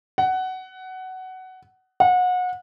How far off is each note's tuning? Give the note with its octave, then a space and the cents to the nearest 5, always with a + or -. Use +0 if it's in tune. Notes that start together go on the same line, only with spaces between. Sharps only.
F#5 +15
F#5 -30